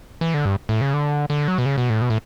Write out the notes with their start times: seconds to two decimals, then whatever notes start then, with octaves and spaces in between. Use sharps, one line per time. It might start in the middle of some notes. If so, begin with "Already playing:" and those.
0.21 E3
0.34 D3
0.45 G2
0.69 A2
0.81 C#3
0.94 D3
1.30 D3
1.48 F#3
1.58 B2
1.66 C#3
1.78 B2
1.90 A2
2.02 B2
2.10 A2